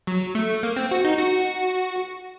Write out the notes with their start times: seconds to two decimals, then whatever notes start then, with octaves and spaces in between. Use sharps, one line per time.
0.07 F#3
0.35 A3
0.63 A#3
0.76 C4
0.91 F#4
1.04 D#4
1.18 F#4